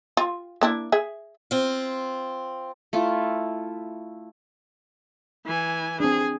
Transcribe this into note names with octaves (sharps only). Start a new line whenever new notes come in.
F4
A#3 D4 E4
G#4 E5
C4 F4
A3 E4 F4
E3 G#5
C4 D4 G#4